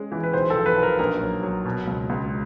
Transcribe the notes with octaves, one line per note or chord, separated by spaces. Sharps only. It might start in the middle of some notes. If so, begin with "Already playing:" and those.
Already playing: G#3 C#4
E3
B4
B1 C5
A4
F3
B4
B1
A#4
A#1 A#4
F#3
F#3
B2
C#2
C#2